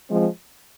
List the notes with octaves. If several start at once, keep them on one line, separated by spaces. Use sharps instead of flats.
F3 G#3 C4